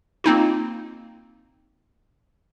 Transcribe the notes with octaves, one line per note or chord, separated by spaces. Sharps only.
A#3 C4 D#4 F4